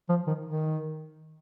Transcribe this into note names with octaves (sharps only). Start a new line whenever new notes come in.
F3
D#3
D#3